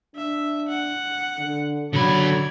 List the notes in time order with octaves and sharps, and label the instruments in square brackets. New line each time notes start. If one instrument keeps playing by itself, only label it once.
[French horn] D4 [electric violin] E5
[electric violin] F#5
[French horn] D3
[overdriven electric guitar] D3 B5 [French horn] F#3 [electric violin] D5 G#6